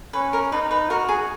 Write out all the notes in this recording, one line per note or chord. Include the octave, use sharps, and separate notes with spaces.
C#4 B4
A#4
D#4 B4
B4
F#4 A#4
G#4